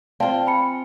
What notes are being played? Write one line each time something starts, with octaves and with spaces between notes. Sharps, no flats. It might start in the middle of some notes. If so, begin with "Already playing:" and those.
C4 F4 D5 F5 A5
G#5 B5 C#7